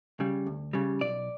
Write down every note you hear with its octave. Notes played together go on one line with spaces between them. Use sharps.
C#3 G3
D2
C#3 G3
B1 D5